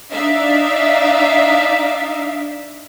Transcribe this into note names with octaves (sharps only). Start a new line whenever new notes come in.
D4 D#4 D5 E5 F5